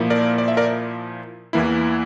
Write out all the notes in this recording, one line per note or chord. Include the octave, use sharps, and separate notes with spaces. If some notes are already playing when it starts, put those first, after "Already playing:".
Already playing: A#2 F3 A#3 E4
A#4 D5
D5
E5
A#4 D5
E2 E3 A#3 E4